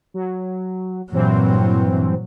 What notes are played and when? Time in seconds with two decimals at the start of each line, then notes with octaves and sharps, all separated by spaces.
0.14 F#3
1.12 G2 A#2 E3 F#3 C4